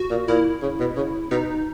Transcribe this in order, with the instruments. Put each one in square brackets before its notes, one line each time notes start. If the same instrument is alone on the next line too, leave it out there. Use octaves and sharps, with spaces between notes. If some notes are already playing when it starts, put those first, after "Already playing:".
Already playing: [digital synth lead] F#4
[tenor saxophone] A#2
[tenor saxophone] A#2 [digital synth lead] E4
[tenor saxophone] C#3
B2
C#3
[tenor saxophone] B2 [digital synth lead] D#4